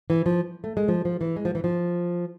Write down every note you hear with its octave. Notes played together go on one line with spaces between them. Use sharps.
E3
F3
A3
G#3
F3
F3
E3
G#3
F3
E3
F3